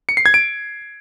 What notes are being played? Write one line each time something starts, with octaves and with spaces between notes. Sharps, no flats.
C#7
C7
G#6
D7